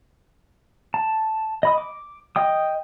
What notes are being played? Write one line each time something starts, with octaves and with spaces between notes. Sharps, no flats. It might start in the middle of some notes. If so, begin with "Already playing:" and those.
A5
D#5 B5 D#6
D6
D#5 G5 D#6